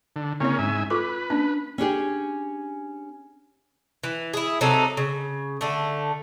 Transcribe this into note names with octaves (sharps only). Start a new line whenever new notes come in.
D3
C#3 A#3 C4 C#4 E4 C#5
G#2 E5 G#5
F4 A4 B4 D6
A#3 C#4 D4
C#4 D4 G4 G#4
E3
E4 G#4
C3 F#3 D#4 A4
C#3
D3 A3